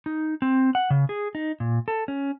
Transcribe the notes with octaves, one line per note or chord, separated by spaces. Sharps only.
D#4
C4
F#5
C#3
G#4
D#4
A#2
A4
C#4